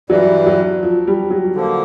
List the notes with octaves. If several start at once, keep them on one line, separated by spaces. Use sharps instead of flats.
G2 E3 F#3 G3
F#3
F3
G3
F#3
D3 F3 A#3